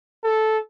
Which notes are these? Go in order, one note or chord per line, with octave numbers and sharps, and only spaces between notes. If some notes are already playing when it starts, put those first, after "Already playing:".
A4